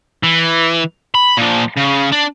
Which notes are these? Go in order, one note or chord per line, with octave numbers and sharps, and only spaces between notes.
E3
B5
A#2 F3
C#3
D4